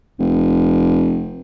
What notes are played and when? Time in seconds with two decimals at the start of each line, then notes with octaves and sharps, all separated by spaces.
0.19 F1